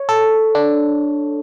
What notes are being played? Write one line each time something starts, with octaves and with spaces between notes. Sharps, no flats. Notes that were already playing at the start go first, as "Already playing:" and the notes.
Already playing: C#5
A4
D4